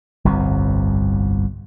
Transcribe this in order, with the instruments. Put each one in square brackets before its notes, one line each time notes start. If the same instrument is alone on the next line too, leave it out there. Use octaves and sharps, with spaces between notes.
[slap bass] G1 C2 F2 C3